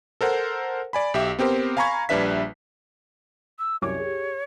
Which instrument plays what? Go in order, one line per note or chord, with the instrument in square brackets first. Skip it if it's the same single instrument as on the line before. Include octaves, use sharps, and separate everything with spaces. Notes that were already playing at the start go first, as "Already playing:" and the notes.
[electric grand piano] A4 A#4 C5 F#5
D5 G#5 B5
B1 G4 E5
B3 C4 G4 A#4 C5
F5 G#5 A#5 B5 C#6 G#6
A#1 G3 D4 B4 E5 B6
[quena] E6
[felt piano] C2 F#2 D6 [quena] C#5
[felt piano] G4 G#4